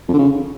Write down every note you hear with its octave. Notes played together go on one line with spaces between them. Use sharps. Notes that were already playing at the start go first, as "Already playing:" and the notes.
F2
D3
C#3